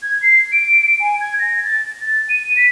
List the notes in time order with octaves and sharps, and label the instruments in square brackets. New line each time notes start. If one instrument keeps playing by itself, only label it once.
[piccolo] G#6
C7
D7
G#5
G#6
A#6
A6
A6
D#7
B6